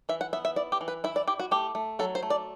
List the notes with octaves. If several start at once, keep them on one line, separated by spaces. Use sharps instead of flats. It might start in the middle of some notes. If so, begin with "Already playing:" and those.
E3 E5
F#5
B3 E5
E5
E4 D5
G4
E3
B4
E4 E5
D5
E4 G4
F#4
A3 G4
A3
F#3 A4
C5
A3
D5